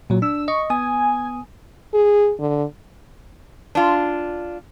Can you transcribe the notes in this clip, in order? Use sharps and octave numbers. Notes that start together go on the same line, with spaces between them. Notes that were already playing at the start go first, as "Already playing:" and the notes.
A#2 F#3
D4 E6
D#5 C#6
B3 G#5 D#6
G#4
D3
D4 F4